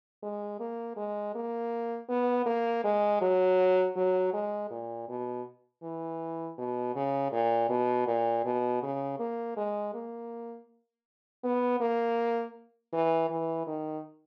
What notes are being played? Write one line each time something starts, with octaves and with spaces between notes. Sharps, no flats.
G#3
A#3
G#3
A#3
B3
A#3
G#3
F#3
F#3
G#3
A#2
B2
E3
B2
C#3
A#2
B2
A#2
B2
C#3
A#3
G#3
A#3
B3
A#3
E3
E3
D#3